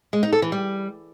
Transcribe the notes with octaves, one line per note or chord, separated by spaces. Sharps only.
G#3
D#4
A4
E3
G3